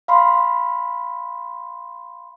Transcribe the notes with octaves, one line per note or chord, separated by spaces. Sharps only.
F5 B5 C6